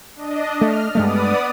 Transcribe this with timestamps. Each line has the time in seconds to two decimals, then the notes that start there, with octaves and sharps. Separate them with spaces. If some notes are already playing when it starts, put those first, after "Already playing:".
0.16 D4 D#5
0.61 A3 F6
0.95 G2 G#3 A3 B3 D5 D#6